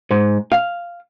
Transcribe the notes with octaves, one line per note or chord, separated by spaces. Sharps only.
G#2
F5